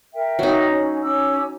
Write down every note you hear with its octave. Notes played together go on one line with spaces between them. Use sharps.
A#4 E5 G5
F#3 D#4
C#4
C#4 D6 E6